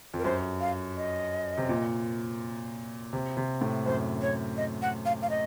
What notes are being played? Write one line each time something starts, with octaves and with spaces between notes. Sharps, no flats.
F2
A#4
F#2 C5
F5
D#5
C3
A#2
C3
C3
A2
F#2 C5
C#5
D#5
F#5
F5
F5
D#5